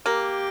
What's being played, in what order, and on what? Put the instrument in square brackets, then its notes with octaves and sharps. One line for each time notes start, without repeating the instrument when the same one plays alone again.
[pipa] A#3 [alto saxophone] G4